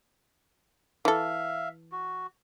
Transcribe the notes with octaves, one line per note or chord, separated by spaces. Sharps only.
E3 A4 E5 F5
F#4